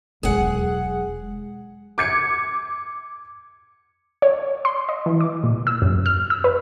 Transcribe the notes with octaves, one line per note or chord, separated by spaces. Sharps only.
E1 F#3 G#3 G#4 F#5
D6 G#6 C#7
C#5
C6
D#5
E3
D6
A#2
E6
F#2
F6
E6
B4